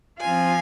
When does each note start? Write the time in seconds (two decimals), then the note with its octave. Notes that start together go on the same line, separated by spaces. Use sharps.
0.20 F3 C4 F4 F5 G#5